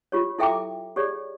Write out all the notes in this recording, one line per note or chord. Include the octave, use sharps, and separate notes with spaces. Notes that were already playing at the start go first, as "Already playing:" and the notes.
F4 G4 C#5
E4 A4 E5 G5 A#5 D6
G4 G#4 C#5 D5